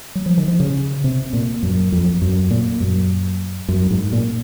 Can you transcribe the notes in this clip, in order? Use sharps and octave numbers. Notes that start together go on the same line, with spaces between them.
F#3
F3
D#3
F3
C#3
C3
A#2
F#2
F2
F#2
A#2
F#2
F#2
G#2
A#2